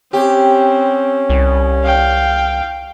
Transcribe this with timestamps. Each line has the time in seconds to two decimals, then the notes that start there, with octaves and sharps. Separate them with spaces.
0.13 C4 C#4 G4
1.30 C2
1.84 F5 G5